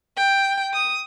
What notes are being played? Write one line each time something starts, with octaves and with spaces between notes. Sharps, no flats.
G5
D#6